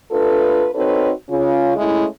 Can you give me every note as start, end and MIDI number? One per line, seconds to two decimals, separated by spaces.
0.11 0.68 57
0.11 0.68 62
0.11 0.68 65
0.11 0.68 69
0.11 0.68 71
0.75 1.10 60
0.75 1.10 63
0.75 1.10 66
0.75 1.10 69
0.75 1.10 71
0.75 1.10 73
1.29 1.74 49
1.29 1.74 61
1.29 1.74 65
1.76 2.05 56
1.76 2.05 57
1.76 2.05 61
1.76 2.05 64